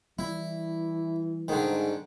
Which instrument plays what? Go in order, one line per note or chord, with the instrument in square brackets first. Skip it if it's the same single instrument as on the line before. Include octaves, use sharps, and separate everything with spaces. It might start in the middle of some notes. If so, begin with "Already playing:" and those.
[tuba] E3 [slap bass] G3 [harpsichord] E4
[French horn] G#2 [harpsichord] D3 D#3